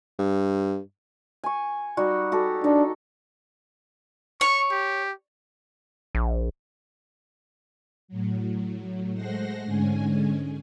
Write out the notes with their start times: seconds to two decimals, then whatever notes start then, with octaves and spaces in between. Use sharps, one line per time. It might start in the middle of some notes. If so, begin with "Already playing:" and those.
0.19 G2
1.44 G#5 C#6
1.97 G3 D#4 F#4
2.32 F#4 G4 A4
2.64 D4 D#4
4.41 C#5 C#6
4.71 G4
6.15 A#1
8.08 A2 F#3
9.14 G#3 A3 C5 F#5 C6 A#6
9.65 G#2 D3 G#3 C#4 G#5